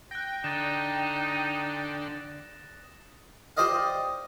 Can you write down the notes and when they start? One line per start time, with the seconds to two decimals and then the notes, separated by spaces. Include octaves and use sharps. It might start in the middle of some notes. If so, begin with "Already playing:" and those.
0.11 G5 F#6 A#6
0.44 D3 D#4 D#6 A6 E7
3.57 G4 C5 D5 D#5 F5